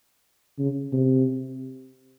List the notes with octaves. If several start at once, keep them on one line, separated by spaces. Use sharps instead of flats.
C#3
C3